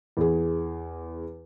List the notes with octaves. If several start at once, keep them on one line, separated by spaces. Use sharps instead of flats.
E2 G#4